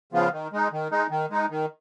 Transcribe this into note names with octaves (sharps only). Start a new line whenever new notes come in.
C#3 F3 B3 F4
D#3
G#3 D#4
D#3
G#3 D#4
D#3
G#3 D#4
D#3